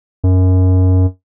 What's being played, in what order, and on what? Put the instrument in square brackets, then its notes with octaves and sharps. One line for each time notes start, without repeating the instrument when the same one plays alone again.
[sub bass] F#2